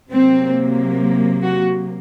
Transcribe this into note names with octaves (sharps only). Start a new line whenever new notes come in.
C3 F#3 A#3 C4
F#4